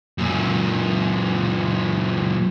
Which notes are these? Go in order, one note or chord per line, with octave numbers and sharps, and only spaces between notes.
F#2 A#2